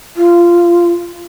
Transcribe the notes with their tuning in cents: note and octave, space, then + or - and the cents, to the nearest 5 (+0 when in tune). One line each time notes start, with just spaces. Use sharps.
F4 -20